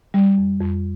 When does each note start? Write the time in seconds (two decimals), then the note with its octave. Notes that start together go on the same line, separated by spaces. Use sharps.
0.14 G3
0.38 F2
0.60 F2